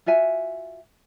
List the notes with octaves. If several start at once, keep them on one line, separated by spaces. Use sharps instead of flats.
F4 F#4 E5 G#5